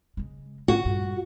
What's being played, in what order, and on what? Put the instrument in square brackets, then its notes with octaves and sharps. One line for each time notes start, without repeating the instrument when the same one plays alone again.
[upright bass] C#3 G#3
[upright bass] D3 [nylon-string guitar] F#4
[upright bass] G2 A#2